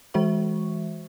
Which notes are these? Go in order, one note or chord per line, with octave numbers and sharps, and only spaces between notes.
E3 G#3 F#4 C5 E5 C#6